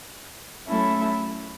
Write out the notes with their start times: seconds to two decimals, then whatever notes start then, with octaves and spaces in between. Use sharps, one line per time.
0.66 F#3 A3 C#4 E4 A4